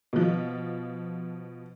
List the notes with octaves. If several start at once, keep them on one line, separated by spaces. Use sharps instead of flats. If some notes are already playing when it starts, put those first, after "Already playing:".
B2 F3